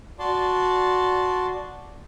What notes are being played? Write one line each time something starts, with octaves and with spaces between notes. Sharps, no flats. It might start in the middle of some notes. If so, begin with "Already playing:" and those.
F#4 D5 A5 C6